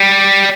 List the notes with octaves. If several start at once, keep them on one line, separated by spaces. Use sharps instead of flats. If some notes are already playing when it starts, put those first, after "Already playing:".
Already playing: G3